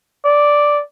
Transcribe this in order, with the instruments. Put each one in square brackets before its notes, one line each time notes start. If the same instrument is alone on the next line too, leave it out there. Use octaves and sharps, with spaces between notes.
[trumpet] D5